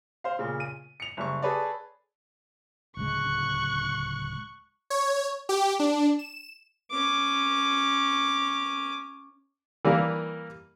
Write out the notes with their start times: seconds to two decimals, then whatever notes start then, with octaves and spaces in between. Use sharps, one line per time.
0.24 C5 F5
0.39 A#2 C#3
0.60 D#7
1.00 C#7 F7
1.17 F#1 G3 C#6
1.42 G#4 A4 B4 C#5 D5
2.97 D1 C#2 G#3 C#6 F#6
4.90 C#5
5.49 G4
5.80 D4
6.19 E7
6.91 C#4 D6
9.85 E3 G3 A#3 A#4